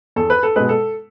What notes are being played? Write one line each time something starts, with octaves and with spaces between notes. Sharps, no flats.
E2 A4
B4
A4
B2 G#3 B4
A4